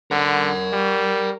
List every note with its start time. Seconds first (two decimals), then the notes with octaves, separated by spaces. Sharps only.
0.11 D3 A#4 F#5
0.73 G3